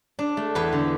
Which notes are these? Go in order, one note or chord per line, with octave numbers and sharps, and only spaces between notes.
D4
A3
E2 B4
D3